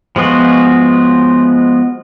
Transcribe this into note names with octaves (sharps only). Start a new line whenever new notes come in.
F3 G#3 B3 F4 F#4